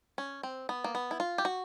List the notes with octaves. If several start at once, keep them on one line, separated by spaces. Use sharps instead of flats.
C#4
C4
B3
A#3
B3
E4
F4
G4
F#4